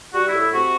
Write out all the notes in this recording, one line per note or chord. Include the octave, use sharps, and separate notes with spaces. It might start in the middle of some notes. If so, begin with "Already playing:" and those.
G3 F#4
E4
A2
E4
C3 F#4